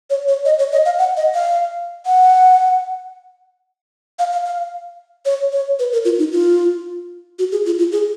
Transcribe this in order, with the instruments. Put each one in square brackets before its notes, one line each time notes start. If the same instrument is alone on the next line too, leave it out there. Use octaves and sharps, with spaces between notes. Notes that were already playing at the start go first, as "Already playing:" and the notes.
[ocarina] C#5
C#5
D#5
C#5
D#5
F5
F#5
D#5
F5
F#5
F5
F5
F5
C#5
C#5
B4
A#4
F4
D#4
F4
F#4
G#4
F4
F4
G#4